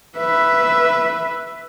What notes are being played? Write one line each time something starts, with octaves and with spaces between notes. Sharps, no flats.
B4 E5